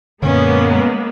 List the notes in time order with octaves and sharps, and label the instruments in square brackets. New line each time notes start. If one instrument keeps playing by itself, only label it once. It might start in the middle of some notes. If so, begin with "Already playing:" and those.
[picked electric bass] F#2 A#2 D3 [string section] G#3 A#3 B3 [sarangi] C#4